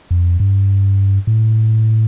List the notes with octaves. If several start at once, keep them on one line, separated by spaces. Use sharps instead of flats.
F2
G2
A2